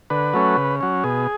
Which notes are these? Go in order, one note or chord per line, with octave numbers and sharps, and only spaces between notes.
D3 B4
F#3 A3 C#4
C#3
F#3 C#4
B2 G#4